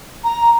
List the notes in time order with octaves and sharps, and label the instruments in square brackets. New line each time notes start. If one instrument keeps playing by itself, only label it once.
[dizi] A#5